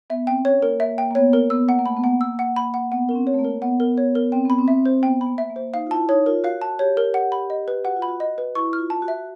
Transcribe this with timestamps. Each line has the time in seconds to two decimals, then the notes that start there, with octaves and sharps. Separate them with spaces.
0.10 B3 E5
0.27 C4 G5
0.45 C#4 C#5
0.62 A#3 A#4
0.80 A#3 E5
0.98 A#3 G5
1.11 A#3
1.15 B3 C#5
1.33 A#3 A#4
1.50 B3 E6
1.68 A#3 F#5
1.79 A#3
1.86 A3 B5
1.97 B3
2.04 A#3 F#5
2.21 E6
2.39 F#5
2.56 B5
2.74 F#5
2.92 B3 F#5
3.09 C#4 A#4
3.15 C4
3.27 C#5
3.34 A3
3.39 A#3
3.45 A#4
3.62 B3 F#5
3.80 A#4
3.98 C#5
4.15 A#4
4.32 C4 G5
4.45 B3 B5
4.58 C4
4.68 E5
4.86 C5
5.03 B3 G5
5.21 B5
5.26 A#3
5.38 E5
5.50 A#3
5.56 C5
5.73 D#4 F5
5.87 F4
5.91 E4 A5
6.09 D#4 C#5
6.26 F4 A#4
6.44 F#4 F5
6.61 A5
6.79 G4 C#5
6.97 A#4
7.14 F#5
7.32 B5
7.50 D#5
7.68 B4
7.85 F#4 F#5
7.96 F4
8.02 B5
8.08 F#4
8.20 D#5
8.38 B4
8.55 E4 C#6
8.73 F6
8.79 F4
8.90 A5
9.02 F#4
9.08 E5